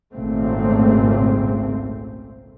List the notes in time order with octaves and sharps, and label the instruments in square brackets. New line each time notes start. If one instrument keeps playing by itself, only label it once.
[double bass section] G#1 C#2 A#2 C#3 A3 C4